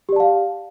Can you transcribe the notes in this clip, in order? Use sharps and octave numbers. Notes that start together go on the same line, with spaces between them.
G4 D5 F5 A5